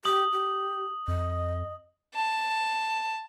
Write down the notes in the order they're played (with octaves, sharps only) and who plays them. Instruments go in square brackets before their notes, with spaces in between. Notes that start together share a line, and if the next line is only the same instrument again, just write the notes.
[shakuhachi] G4 [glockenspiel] D#6 F#7
[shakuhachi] G4
[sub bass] F2 [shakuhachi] D#5
[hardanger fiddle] A5